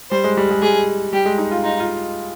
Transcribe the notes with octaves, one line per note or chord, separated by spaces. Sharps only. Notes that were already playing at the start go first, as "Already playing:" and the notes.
G3 C5
G#3
G3
G#3
G3 G#4
G3 G4
G#3
D#4
F4
D#4 F4
F4